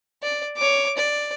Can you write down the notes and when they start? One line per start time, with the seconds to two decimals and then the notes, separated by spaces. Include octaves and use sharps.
0.23 D5
0.57 C#5 D6
0.98 D5